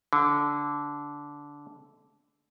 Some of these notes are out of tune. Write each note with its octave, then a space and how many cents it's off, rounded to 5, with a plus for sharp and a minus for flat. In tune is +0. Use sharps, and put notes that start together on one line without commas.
D3 -15